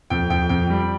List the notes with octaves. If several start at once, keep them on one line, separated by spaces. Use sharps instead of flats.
F2 G5
F2 G5
F2 G5
G3